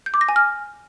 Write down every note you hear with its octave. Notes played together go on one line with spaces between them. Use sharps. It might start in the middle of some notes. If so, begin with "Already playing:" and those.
G6
D6
A#6
G#5
F6